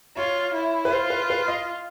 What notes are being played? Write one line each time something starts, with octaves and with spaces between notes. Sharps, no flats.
F4 C#5
E4
B4
F4 C5
B4
B4
D#5